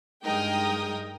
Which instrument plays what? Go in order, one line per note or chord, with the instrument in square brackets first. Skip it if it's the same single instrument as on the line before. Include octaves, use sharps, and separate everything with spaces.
[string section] G2 G#3 D#4 A#4 G5 D#6